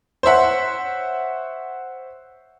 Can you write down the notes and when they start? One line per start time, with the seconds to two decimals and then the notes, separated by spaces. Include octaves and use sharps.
0.23 C5 C#5 E5 F#5